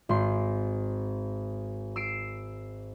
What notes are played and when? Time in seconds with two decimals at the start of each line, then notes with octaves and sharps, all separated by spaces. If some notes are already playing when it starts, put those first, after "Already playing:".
0.09 G#1 C6
1.96 E6 C7 D7